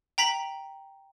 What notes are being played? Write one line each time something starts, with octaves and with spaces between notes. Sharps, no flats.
G5 A#5 B6 F#7